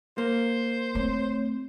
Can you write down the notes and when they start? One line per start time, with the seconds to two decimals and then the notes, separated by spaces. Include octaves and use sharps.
0.18 A#3 C5
0.95 A3 C4 C#5